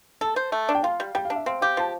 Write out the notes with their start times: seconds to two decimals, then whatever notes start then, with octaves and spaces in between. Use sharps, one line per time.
0.21 A4 A5
0.36 C5
0.52 A3
0.69 D4
0.75 G5
0.83 F4 F5
1.00 G3
1.15 G3 G5
1.25 F5
1.30 D4
1.36 E5
1.46 C4 F5
1.61 G4 F5
1.77 F3 A5